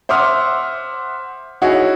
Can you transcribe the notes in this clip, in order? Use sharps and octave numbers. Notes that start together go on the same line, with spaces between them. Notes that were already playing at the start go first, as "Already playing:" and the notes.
C5 E5 F#5 D6 D#6 F6
D#4 E4 F#4 G#4 C#5